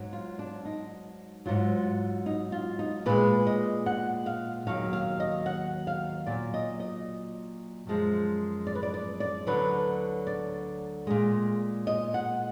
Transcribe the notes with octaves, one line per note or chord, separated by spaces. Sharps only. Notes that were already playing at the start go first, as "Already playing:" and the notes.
Already playing: G#2 F#3
F4
D4
D#4
G#2 F#3 F4
D#4
F4
D#4
A#2 G#3 B4
D#5
F#5
F5
D#2 D#3 F#3 F5
F5
D#5
F#5
F5
A#2 F#3 D5
D#5
D#5
F#2 F3 G#3
D5
B4
D5
D5
D5
D2 D3 F#3 B4
D5
A#2 G#3
D#5
F#5